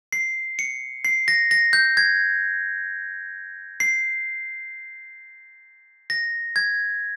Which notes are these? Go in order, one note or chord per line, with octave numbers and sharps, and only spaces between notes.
C7
C#7
C7
A#6
A#6
G6
G#6
C7
A#6
G#6